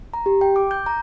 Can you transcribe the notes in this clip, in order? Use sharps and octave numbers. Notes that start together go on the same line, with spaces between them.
A#5
G4
G5
D6
G6
A#5